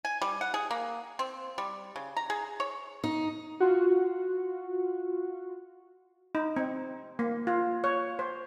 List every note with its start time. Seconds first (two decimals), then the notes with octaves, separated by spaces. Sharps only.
0.05 G#5
0.22 G3
0.41 F#5
0.54 G#4
0.71 A#3
1.19 C4
1.58 G3
1.96 C#3
2.17 A#5
2.30 G#4
2.60 C#5
3.04 D#4
3.60 F4 F#4
6.35 D#4
6.56 C4
7.19 A#3
7.47 F4
7.84 C#5
8.19 C5